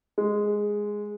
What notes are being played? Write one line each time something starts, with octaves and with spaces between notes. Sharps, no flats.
G#3